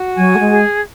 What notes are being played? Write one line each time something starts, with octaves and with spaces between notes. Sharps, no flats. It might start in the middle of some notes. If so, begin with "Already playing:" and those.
Already playing: F#4
F#3 G#5
A3
G#3
G#4